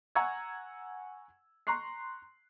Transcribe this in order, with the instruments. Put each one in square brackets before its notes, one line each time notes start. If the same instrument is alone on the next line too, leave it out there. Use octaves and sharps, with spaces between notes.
[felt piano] F#5 G#5 A#5 C#6 E6 G#6
A#5 C6 C#6 F#6 C7